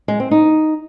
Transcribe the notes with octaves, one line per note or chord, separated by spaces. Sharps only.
G#3
C4
D#4